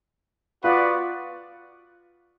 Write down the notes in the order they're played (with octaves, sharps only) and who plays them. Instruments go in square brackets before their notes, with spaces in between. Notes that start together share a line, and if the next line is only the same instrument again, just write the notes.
[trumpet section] B3 F#4 B4 D5 [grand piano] F4